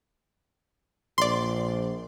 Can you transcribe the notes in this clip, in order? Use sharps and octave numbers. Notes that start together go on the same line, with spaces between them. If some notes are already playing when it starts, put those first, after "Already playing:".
A#1 D5 C6